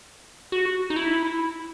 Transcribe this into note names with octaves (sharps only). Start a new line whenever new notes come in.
F#4
D#4
E4